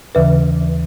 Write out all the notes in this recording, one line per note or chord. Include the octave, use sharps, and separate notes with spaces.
D#2 C#3 E3 B4